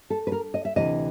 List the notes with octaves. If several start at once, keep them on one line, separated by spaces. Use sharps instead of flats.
A4
B4
A#4
D#5
E5
D2 C3 E3 D#5